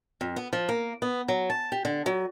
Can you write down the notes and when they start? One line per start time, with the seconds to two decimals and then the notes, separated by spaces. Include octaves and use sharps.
0.21 F2
0.36 B3
0.53 F3
0.69 A#3
1.02 B3
1.28 F#3
1.50 A5
1.72 G4
1.85 D3
2.06 F#3